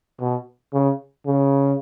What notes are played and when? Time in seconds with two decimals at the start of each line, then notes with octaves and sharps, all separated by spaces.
0.20 B2
0.73 C#3
1.26 C#3